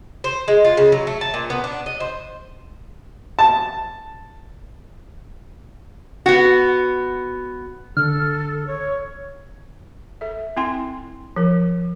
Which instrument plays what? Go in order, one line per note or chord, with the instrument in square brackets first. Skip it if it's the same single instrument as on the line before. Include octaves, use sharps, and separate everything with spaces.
[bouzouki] C5
G#3
F4
C#3
F#3
A3
A5
A#2
B3
D4
D#5
C5
[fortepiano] A5
[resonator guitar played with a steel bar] B3 F#4
[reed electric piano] D3 [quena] A4 [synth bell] F6
[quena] C#5
[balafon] A4 E5
C4 E4 G5 G#5 C6
F3 A#4